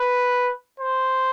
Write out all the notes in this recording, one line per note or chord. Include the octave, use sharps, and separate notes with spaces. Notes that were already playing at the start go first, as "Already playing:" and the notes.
Already playing: B4
C5